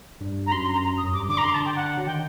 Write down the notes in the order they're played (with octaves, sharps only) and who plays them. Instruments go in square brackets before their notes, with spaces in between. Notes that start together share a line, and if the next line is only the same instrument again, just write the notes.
[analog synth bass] G2
[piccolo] A#5
[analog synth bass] F#2 [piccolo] C6
[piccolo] C6
A#5
A#5
D#6
[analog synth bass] F#2
[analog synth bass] G2 [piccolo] D6
[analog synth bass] D3 [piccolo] D6
[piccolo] A#5
[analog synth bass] D3 [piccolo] C6
[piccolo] A#5
A5
G5
F#5
[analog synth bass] F#3
[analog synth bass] D#3 [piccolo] G5